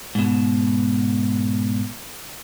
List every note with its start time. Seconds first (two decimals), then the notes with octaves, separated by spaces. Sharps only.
0.15 G#2 B2